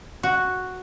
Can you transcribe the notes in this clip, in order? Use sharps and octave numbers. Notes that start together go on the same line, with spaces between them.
F#4